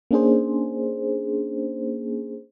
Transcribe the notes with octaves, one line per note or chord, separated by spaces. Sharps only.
A#3 C#4 D4 G#4 C5